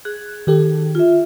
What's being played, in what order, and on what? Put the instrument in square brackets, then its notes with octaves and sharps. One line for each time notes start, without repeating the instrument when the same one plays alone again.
[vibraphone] G#4 [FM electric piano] F#6
[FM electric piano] D#3 G4 A4
[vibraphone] F4 E5